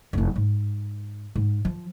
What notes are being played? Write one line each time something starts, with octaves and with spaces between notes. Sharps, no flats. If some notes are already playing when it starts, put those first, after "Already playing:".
F1 E4
G#2
G#2
F3